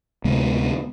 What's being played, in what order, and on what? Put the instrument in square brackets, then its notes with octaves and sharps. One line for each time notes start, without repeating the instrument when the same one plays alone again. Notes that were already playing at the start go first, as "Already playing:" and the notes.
[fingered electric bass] D2 C3 G#3 B3